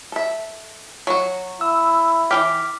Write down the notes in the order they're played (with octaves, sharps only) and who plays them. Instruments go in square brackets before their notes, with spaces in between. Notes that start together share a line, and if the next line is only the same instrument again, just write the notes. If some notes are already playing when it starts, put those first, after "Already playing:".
[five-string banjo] A4 E5
F#3 F#4
[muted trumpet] E4 [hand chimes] E6
[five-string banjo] E3 F#3 G5 [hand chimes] D6 F6 B6